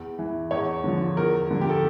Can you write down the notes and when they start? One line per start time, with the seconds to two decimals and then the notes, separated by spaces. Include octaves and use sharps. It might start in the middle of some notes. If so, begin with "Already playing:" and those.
Already playing: E2
0.19 E3
0.51 E2 C#5
0.84 D3 F3
1.17 E2 A#4
1.51 D3 F3
1.61 G4
1.69 A4